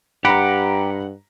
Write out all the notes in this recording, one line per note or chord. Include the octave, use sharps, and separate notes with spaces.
G2 G4 F#5 A#5 B5